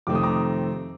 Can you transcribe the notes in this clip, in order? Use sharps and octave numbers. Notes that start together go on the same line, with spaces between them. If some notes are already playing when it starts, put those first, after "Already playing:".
F2 C3 D#3 A3 C4 D6
D#6
A#5 D6